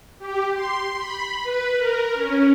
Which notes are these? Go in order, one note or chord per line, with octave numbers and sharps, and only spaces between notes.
G4
C6
B5
B4
A#4
C#4